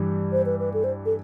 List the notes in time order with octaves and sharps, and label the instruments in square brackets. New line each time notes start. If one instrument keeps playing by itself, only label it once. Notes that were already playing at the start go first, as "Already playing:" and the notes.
Already playing: [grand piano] G2 E3 G3
[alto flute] C5
B4
B4
A4
C5
A4